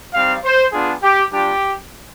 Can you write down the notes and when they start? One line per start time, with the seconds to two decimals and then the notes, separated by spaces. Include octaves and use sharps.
0.14 G3 C4 D#4 F5
0.44 C5
0.73 B3 D4 F4 G#4
1.03 G4
1.32 G3 D4 F4 G4